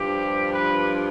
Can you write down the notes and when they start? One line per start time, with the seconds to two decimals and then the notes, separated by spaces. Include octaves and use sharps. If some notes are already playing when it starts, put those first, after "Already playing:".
Already playing: G2 F3 G4
0.53 B4